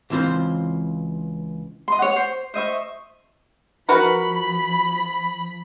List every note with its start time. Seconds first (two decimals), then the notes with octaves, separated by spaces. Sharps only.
0.10 C#2 E3 C4 F4 C5
1.88 D#5 C6
1.99 C#5 F#5
2.16 C5
2.54 C5 D#5 E5 C#6
3.89 F3 F#4 A#4 B4 B5